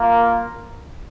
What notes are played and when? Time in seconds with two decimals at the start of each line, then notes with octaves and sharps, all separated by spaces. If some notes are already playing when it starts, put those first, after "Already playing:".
Already playing: A#3 F4
0.08 A#4